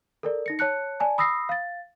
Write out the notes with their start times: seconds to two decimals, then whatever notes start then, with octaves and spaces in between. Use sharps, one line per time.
0.23 A4 A#4 D5
0.46 D#4 A#6 C#7
0.59 C#5 A5 F#6 C#7
1.00 D5 G#5 A5
1.18 B5 D#6 E6 A#6 C7
1.49 F5 A6